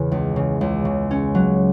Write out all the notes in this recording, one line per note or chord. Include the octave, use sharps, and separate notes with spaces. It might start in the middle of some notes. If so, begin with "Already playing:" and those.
Already playing: E2 C#3 E3
C#2
C#3
C#2
C#3
C#4
F#3